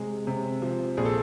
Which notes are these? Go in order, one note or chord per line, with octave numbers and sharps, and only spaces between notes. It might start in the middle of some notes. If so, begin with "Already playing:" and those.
Already playing: C3 G#3
C3
F3
A#1 G#4
A4